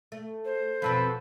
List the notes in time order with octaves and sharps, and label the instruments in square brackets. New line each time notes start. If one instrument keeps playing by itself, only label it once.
[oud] A3
[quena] C5
[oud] F2 B2 C4 [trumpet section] A4 B4